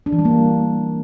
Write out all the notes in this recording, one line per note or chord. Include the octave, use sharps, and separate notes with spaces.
D4
E3
G3
A#3